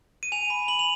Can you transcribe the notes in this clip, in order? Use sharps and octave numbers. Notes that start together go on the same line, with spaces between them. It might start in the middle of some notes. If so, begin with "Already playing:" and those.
D#7
G#5 F7
B5
B5 F#7
F7